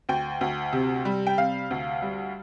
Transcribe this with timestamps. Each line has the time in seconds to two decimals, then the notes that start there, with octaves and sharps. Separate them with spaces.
0.09 D2 G5
0.41 D2
0.73 C3
1.05 G3
1.27 G5
1.37 C3 F5
1.71 D2
2.02 G3